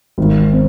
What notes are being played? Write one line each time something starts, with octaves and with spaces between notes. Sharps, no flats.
G#1
C4